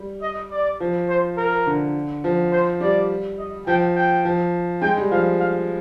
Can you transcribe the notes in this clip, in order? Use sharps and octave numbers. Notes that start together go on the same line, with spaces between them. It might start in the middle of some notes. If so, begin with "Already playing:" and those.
Already playing: G3
D#5
D5
F3
C5
A#4
D3
F3
C5
G3 D5
D#5
F3 G5
G5
F3
G#3 G5
G3
F3 F5
F5